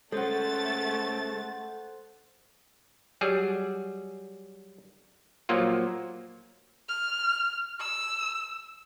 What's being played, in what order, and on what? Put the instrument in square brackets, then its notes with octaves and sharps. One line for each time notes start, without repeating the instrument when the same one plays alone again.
[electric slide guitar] G#3 C#4 [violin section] A3 A6 [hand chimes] A4 [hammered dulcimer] C5 F#5
[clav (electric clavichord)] F#3 G3 G#4
A#2 F3 F#3 A#3 F4
[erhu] F6
E6